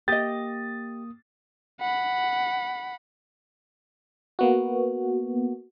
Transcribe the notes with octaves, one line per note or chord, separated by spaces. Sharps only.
A#3 G4 D#5 D#6 A6
F#5 B5
A#3 B3 F#4